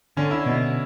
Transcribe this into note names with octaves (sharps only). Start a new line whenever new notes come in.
D3 C#4
E4
B2